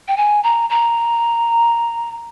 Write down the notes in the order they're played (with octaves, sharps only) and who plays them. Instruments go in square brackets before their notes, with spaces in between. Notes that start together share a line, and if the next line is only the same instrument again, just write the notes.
[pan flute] G5
G#5
A#5
A#5